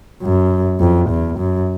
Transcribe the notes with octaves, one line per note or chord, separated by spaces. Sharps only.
F#2
F2
E2
F#2